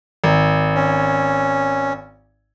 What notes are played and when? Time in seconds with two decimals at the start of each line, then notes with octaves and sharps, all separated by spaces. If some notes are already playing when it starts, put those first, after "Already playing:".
0.24 G#1
0.75 C#4